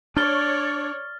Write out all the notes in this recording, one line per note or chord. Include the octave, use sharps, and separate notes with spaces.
D4 C#5 D5 F6 A6 G7